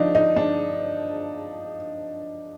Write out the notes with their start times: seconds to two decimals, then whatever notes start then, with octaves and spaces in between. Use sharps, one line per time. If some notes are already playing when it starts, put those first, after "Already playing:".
Already playing: F3 D4 D#4
0.15 D#4
0.36 D4